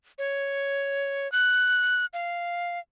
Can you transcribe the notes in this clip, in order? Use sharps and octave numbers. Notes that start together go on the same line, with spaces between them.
C#5
F#6
F5